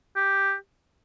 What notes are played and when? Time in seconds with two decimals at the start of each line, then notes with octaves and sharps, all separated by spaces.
0.16 G4